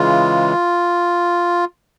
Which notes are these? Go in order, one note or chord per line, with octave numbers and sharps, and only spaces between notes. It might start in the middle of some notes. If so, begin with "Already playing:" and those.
Already playing: C#3 E3 G#3 F4